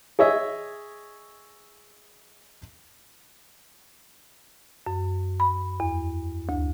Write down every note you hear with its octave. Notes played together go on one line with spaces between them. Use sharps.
G#4 C#5 D#5 E5
F#2
B5
E2
D2